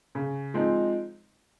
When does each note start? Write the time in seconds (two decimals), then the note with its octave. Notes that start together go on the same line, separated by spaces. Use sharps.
0.15 C#3
0.54 F3 G#3 C4 D#4